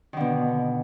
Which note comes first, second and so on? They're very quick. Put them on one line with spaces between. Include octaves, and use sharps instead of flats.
D#3 D3 B2